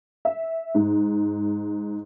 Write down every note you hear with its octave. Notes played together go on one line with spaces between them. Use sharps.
E5
G#2